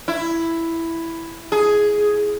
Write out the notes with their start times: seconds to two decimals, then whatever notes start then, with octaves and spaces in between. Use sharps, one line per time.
0.08 E4
1.52 G#4